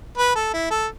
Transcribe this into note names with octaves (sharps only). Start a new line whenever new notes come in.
B4
A4
E4
A4